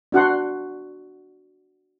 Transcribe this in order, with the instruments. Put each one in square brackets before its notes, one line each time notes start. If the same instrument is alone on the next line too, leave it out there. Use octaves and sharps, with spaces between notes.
[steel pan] D4 F#4 F#5 C6